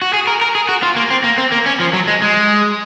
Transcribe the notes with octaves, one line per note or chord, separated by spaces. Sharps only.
F#4
G#4
A#4
A#4
G#4
F#4
F4
A#3
C4
A#3
C4
A#3
C#4
F3
F#3
G#3
G#3